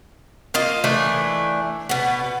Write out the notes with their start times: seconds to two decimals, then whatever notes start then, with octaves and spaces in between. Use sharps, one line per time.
0.54 A#3 F4 D#5
0.84 E3 A3 D4 E4
1.89 B2 B3